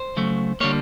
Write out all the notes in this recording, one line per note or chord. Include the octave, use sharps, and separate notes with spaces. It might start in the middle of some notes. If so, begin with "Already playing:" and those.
Already playing: C5
C#3 F#3 A3
D3 G3 A#3 C#5